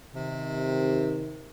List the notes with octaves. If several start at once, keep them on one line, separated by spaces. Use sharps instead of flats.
C3 D#3